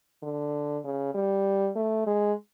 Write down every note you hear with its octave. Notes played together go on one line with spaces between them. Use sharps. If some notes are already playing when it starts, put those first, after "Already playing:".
D3
C#3
G3
A3
G#3